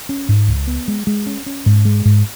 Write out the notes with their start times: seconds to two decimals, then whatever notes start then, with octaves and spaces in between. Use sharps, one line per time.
0.09 C#4
0.29 G#2
0.48 C#2
0.67 B3
0.88 G#3
1.07 G#3
1.26 C#4
1.46 C#4
1.66 G#2
1.85 G#3
2.05 G#2